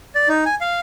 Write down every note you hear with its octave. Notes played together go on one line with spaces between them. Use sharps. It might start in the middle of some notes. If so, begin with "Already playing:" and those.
D5
D#4
G#5
F5